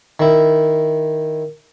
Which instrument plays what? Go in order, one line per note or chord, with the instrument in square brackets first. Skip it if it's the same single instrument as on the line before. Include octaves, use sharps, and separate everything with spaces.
[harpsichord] D#3 E4